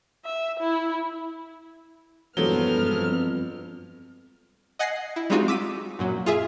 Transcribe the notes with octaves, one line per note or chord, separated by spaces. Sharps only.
E5
E4
E1 G2 F3 F#3 B3 A4 F6 G7
F2
D#5 F#5 G#5 G#6 A#6 C7
E4
G3 G#3 C4 D#4 F4 F#4
D6 E6 B6 D#7
F#2 A#2 F#3
F4 G#4 E5